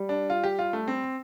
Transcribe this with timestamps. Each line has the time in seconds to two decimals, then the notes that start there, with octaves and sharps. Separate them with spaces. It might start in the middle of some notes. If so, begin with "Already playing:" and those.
Already playing: G3
0.09 D4
0.30 F4
0.44 G4
0.59 F4
0.73 A3
0.88 C4